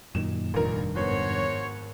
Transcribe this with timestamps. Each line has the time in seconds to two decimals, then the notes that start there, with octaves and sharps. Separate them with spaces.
0.15 F#2 A#2 D#3 E7
0.54 F1 A#1 G2 D#3 A#4
0.96 G#1 B3 F#4 C5 C#5